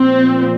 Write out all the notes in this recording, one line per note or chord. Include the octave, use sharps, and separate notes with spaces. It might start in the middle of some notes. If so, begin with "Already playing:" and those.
Already playing: A#2 F3 C4